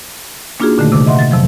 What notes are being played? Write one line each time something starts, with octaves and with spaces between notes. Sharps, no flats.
A#3 D4 D#4 F4 F#4 G#4
A#2 D3 D#3 A3
C3 D6 E6
D#5 E5 F#5 C6
A6
F2 C3 F3 F#3